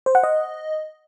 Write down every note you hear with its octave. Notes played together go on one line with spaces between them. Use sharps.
C5
F#5
D#5